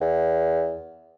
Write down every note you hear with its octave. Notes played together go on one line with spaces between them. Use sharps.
E2